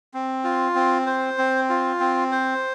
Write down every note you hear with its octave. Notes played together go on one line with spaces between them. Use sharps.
C4
F4
C4
C5
C4
F4
C4
C5